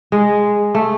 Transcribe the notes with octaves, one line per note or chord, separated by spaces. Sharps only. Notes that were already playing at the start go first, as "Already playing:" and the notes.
G#3
A3